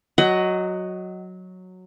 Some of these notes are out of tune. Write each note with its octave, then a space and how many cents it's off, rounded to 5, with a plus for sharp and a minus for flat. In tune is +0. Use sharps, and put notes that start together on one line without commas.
F#3 -5 D#5 +0 F#5 +25